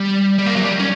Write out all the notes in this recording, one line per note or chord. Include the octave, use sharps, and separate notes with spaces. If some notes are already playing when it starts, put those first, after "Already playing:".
Already playing: G3
G3
A#3
F#3
G3
C#4